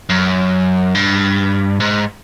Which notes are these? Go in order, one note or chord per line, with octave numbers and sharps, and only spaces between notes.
F#2
G2
G#2